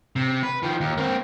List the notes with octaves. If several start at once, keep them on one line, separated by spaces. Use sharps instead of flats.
C3
B4
D#3 F3
D#2
A#3 C4